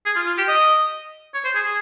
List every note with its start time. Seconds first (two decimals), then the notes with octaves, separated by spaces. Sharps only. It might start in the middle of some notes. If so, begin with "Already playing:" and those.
0.06 G#4
0.16 F4
0.27 F4
0.38 G4
0.48 D#5
1.34 C#5
1.45 C5
1.55 G#4
1.66 G#4